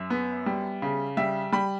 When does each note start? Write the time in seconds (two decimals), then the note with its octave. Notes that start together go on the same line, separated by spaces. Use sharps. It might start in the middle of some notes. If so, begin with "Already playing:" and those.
Already playing: F#2 E5
0.10 B3
0.46 G3
0.82 C#3
1.17 G3 E5
1.52 G3 B5